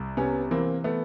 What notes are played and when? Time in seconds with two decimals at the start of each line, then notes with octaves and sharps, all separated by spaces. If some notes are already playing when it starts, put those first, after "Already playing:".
Already playing: C2
0.17 C3 B3 C#4
0.51 E3 A#3 C4
0.84 A3 B3